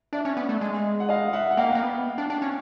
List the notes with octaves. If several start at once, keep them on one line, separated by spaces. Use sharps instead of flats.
D4 D5 E5
C#4
B3
A3
G#3
F#5
D#5 F5
E5 F#5
F#5
A#3 F5 G5
A#3
B3
D4
D4
C#4